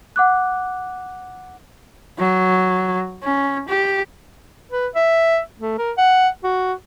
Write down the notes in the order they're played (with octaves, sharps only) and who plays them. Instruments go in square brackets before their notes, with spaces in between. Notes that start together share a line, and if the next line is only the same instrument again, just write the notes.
[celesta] F#5 D6 F#6
[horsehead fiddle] F#3
C#4
G4
[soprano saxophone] B4
E5
A3
A#4
F#5
F#4